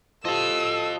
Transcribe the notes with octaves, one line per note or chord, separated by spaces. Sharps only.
F3 G4 A4 D#5 A5 E6